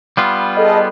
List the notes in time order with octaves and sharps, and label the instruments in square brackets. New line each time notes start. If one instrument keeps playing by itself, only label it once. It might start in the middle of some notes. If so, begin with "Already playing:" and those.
[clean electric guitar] G3 B3 F4
[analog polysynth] G#4 A4 D#5